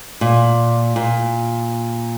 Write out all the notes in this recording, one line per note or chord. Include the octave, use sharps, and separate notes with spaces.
A#2
A#2